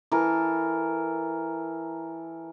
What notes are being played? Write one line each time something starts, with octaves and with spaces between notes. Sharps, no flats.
E3 A4 A#4